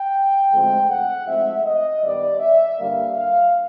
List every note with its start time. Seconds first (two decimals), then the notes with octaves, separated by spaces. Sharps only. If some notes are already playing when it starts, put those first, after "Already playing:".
Already playing: G5
0.51 D2 D3 F3 G#3 C4
0.90 F#5
1.27 G#2 F3 A3 C4 E5
1.65 D#5
2.03 G2 D#3 G3 B3 D5
2.40 E5
2.78 G2 D3 G3 A#3 F5
3.16 F5